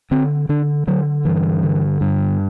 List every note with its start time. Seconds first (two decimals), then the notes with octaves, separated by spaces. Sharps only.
0.11 D3 C4
0.49 D3 D4
0.87 D3 F#3
1.25 G2 E3
1.63 D3
2.01 G2